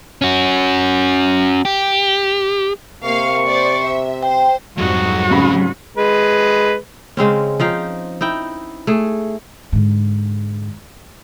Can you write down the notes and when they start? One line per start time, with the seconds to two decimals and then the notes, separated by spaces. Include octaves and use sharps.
0.22 C#4 F#4
1.65 G4
3.04 C3 A#3 F5 C#6
3.47 C5 D5
3.84 E5
4.23 C5 G5
4.78 F2 G#2 F#3 G3 F#4 D#5
5.30 F1 C#3 B5
5.97 G#3 B4
7.17 C#3 G#3 C4 C#4
7.60 F3 D#4 F5 G5
8.21 D#4 E4 G5
8.87 A3 G#4
9.72 G#2 D3